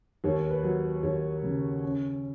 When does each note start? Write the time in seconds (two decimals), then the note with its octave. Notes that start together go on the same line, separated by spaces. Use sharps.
0.24 D#2 C#5
0.50 B4
0.63 F#3
1.03 D#2 C#5
1.43 C#3
1.83 C#4